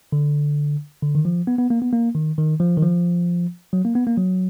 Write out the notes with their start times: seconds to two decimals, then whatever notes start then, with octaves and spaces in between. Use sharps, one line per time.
0.12 D3
1.02 D3
1.15 D#3
1.25 F3
1.47 B3
1.58 B3
1.70 A#3
1.82 B3
1.93 A#3
2.15 D#3
2.38 D#3
2.60 F3
2.78 D#3
2.82 F3
3.73 F#3
3.85 A#3
3.95 B3
4.07 A#3
4.18 F#3